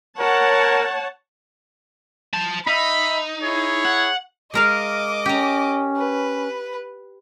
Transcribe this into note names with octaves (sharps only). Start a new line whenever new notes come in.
A#4 C#5 F#5 A5
C5 A5
D#4 E5 B5
E4 G#4 C#5
F#5
G#3 A#4 D#5 F5 D6
C#4 G4 A#5
B4